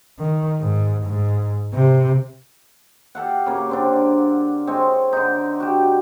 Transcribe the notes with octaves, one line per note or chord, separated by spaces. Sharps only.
D#3
G#2
G#2
C3
G4 A4 F5 F#5
C#3 A#3
D3 C4 D4
G#3 C4 C#5
D3 D#4
F#4 G4